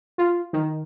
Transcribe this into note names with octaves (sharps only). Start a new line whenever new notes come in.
F4
D#3